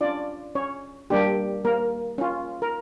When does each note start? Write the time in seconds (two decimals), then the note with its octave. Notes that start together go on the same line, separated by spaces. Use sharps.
0.01 C#4 D4 F4 D5
0.55 C#4 C#5
1.10 G3 A#3 D4 G4
1.65 A#3 A#4
2.18 C#4 F4
2.62 A#4